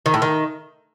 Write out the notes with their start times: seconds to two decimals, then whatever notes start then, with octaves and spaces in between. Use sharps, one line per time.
0.06 D#3
0.14 A2
0.22 D#3